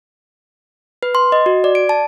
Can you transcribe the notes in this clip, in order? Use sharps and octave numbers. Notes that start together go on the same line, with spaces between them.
B4
C6
D#5
F#4
D5
D7
A5